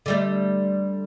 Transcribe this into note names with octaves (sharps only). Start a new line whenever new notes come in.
D3 G3 A3